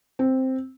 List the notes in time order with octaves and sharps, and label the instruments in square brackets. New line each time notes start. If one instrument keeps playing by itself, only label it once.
[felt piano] C4